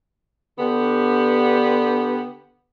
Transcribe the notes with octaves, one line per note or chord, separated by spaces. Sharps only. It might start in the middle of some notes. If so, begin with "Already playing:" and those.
D3 B3 G4